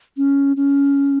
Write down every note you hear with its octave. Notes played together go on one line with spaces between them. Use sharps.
C#4
C#4